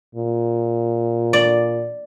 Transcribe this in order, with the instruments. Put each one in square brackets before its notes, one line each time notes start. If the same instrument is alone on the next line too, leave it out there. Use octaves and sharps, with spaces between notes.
[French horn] A#2
[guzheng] D5